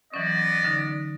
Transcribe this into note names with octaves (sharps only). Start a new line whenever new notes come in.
E3 F#3 B3 C#4 D5 D#5
D3 D#4